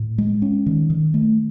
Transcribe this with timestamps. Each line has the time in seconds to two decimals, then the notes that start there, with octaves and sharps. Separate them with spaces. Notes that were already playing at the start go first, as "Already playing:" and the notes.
Already playing: A2
0.18 G#3
0.42 C#4
0.66 D#3
0.90 D#3
1.14 A3